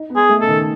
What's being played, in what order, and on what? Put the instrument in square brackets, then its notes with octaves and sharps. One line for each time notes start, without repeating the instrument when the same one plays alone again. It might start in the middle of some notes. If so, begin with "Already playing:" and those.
Already playing: [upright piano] D#4
B3
[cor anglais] G#4
[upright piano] A3
[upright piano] C#3 [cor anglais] A4
[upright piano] D#3